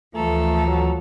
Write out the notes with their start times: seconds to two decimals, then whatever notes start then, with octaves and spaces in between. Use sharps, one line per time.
0.15 D2 E3 F3 A3 A4 A#5
0.67 F#3